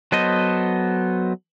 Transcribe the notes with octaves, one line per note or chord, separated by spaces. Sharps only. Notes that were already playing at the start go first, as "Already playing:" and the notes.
F#3 B3 A4 C5 D#5